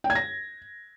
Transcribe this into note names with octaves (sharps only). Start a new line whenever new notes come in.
G5
G#6
A#6